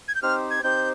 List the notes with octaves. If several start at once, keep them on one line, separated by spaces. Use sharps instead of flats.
G#6
G6
C4 D#4 G4 C5 F6
G#6
C4 D#4 G4 C5 G6